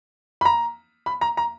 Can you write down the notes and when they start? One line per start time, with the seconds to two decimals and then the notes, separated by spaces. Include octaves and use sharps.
0.41 B5
0.45 A#5
1.06 B5
1.21 A#5
1.37 A#5